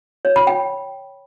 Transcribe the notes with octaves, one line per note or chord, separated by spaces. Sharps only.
C#5
B5
G5